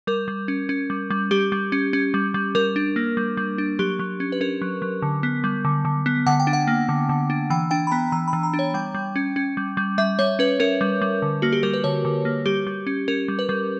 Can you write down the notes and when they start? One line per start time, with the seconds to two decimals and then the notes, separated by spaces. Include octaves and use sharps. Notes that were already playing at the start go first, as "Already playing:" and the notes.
0.07 G3 A#4
0.28 G3
0.48 C#4
0.69 C#4
0.90 G3
1.10 G3
1.31 G3 G4
1.52 G3
1.72 C#4
1.93 C#4
2.14 G3
2.34 G3
2.55 G3 A#4
2.76 D4
2.96 A#3
3.17 G3
3.37 G3
3.58 D4
3.79 F#3 G4
3.99 F#3
4.20 C#4
4.32 B4
4.41 C#4 A#4
4.62 F#3
4.82 F#3
5.02 D3
5.23 B3
5.44 G3
5.65 D3
5.85 D3
6.06 B3
6.26 D3 F#5
6.40 G5
6.47 D4
6.53 F#5
6.67 A#3
6.89 D3
7.09 D3
7.30 D4
7.50 E3 G5
7.71 D4 G5
7.87 B5
7.91 B3 A#5
8.12 E3 A#5
8.28 B5
8.33 E3
8.43 A#5
8.53 D4
8.59 C#5
8.74 G3 G5
8.94 G3
9.16 C#4
9.36 C#4
9.57 G3
9.77 G3
9.98 G3 E5
10.19 G3 C#5
10.39 C#4 B4
10.60 C#4 A#4
10.81 G3
11.02 G3
11.22 D3
11.42 A#3 F#4
11.52 G4
11.63 G3 A#4
11.73 B4
11.84 D3 C#5
12.05 D3
12.25 A#3
12.46 G3 G4
12.67 G3
12.87 C#4
13.08 C#4 A#4
13.28 G3
13.39 B4
13.49 G3